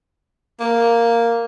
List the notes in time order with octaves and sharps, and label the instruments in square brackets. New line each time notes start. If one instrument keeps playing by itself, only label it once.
[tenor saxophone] A#3